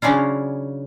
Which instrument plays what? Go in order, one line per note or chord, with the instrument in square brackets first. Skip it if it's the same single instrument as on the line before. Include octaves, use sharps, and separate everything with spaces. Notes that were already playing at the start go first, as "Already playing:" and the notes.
[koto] C#3 F#3 C#4 D4 E4 F4